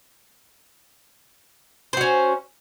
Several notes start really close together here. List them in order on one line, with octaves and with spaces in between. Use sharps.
C5 F#4 C#4